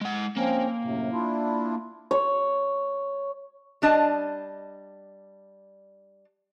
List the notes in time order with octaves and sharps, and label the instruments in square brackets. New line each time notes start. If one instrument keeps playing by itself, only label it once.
[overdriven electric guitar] G#3 F#5
[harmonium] F3 C4 C#4 [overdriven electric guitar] A#3
[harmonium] F#2 A2 C3
D4 E4 F4
[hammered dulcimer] C#5
[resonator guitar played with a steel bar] G3 D4 D#5 A5